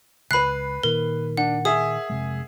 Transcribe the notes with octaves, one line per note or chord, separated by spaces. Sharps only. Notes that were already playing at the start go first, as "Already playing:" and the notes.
C#2 B4 B5 F#6 C7
A#2 D#3 A#4
D4 F#5
G#4 E5 D#6
F1 C3 G#3